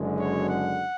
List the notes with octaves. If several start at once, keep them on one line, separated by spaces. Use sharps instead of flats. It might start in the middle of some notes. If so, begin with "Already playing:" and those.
Already playing: F#1 F#2 D3 G#3
C#5
F#5